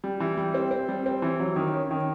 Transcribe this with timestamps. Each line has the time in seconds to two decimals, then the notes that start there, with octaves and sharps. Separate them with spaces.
0.04 G3
0.20 E3
0.38 G3
0.54 C4
0.71 C4
0.89 G3
1.06 C4
1.22 E3
1.40 F#3
1.56 D#3
1.74 C#4
1.91 D#3